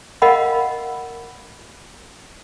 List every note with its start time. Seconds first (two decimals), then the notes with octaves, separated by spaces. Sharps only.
0.22 A#4 D#5 F5 F#5 B5